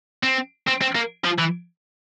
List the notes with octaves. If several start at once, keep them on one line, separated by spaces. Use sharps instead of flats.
C4
C4
C4
A#3
F3
E3